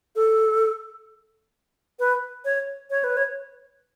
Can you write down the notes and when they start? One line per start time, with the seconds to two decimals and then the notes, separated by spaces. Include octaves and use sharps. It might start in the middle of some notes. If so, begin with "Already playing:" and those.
0.16 A4
1.99 B4
2.45 C#5
2.90 C#5
3.04 B4
3.17 C#5